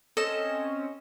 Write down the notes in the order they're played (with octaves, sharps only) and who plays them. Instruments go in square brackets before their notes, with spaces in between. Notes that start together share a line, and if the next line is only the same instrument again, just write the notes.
[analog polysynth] C4 C#4 [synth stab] A4 E7 [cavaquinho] D#5